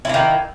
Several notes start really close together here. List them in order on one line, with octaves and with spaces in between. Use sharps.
E4 A#3 D#3